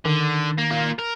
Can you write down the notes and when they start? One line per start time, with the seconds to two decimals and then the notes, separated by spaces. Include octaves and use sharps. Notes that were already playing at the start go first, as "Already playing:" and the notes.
0.05 D3 D#3
0.58 A#3
0.71 A#3 F4
0.99 A#4